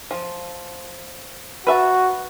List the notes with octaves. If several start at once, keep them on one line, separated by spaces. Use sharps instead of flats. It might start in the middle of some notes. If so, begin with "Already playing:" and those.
F3
F#4 B4 E5 A5